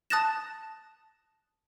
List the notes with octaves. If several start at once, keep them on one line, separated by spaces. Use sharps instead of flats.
A5 D#6 F#6 A6 A#6 E7